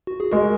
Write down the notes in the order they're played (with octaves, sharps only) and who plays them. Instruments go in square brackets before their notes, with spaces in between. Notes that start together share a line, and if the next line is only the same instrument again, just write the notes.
[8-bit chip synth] F#4
G#4
[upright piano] G#3 [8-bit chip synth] F#4 A#4